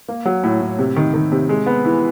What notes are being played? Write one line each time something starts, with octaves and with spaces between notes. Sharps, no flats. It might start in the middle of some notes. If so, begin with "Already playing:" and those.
A#3
F#3
A2
A2
C3
D#3
D#3
C3
G#3
B3
E3